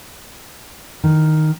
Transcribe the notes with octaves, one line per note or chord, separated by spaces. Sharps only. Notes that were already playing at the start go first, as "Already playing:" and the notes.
D#3